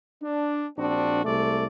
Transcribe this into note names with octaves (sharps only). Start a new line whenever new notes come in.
D4
A#1 C4 D4 F#4
C2 G#3 A3 D5